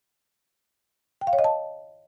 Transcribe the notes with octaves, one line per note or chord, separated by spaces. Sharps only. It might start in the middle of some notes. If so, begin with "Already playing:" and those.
G5
F5
C#5
D#5
A5